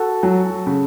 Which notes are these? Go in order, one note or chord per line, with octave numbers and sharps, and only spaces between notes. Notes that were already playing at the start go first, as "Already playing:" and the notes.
Already playing: F#4 A4
F#3
C#3